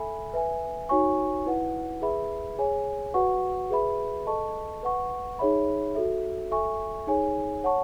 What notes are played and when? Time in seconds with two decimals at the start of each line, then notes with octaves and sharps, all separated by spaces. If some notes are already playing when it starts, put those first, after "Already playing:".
Already playing: A4 E5 G#5 B5
0.33 B4 E5 G#5
0.89 D#4 F#4 C#5 G#5 C#6
1.46 E4 B4 F#5
2.02 G#4 B4 E5 B5
2.58 G#4 C#5 G#5
3.14 F#4 B4 F#5 C#6
3.70 G#4 B4 E5 B5
4.27 A4 D#5 A5 C#6
4.83 B4 F#5 C#6
5.39 D#4 G#4 C#5 E5 B5
5.95 F#4 A4 E5
6.51 A4 E5 G#5 C#6
7.07 D#4 G#4 C#5 G#5
7.64 C#5 F#5 A5 C#6